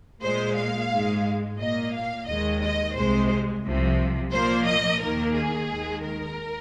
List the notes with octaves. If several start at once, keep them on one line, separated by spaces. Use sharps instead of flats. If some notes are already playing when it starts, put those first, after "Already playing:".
A#2 G#3 C5
F5
G#2 G#3
A#2 A#3 D#5
F5
D#2 D#3 G#3 D#5
D#5
C2 C3 G#3 C5
C2 C3 F3
A#2 F3 A#3 C5
D#5
D#2 D#3 A#3 A#4
G#4
D#2 D#3 G#3
A#4